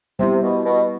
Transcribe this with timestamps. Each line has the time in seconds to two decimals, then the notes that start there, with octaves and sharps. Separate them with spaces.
0.19 C3 G3 B3 E4
0.43 B2
0.65 B2